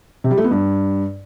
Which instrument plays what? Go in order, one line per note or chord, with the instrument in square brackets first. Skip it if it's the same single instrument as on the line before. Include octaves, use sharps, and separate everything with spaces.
[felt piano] C3
G3
A3
B3
G2